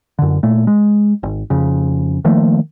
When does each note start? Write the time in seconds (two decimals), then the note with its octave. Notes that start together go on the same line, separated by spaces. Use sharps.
0.19 F#2 D3
0.43 A#2 A3
0.67 G#3
1.23 G#1
1.50 F2 C#3
2.25 D#3 F3 A3 A#3